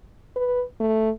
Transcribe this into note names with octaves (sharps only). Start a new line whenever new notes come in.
B4
A3